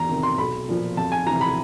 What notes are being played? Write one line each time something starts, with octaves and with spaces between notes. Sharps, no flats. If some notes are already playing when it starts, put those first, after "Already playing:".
Already playing: E2 A#5
C3 D#3
C6
B1 B5
A#2 F3
F2 A5
G#5
C3 E3 A#5
B5